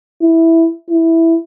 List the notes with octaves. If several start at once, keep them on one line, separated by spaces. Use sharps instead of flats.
E4
E4